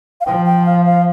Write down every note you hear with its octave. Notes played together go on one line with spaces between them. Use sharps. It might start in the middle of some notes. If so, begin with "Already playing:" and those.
F5
F3 G5
G5
F5
F5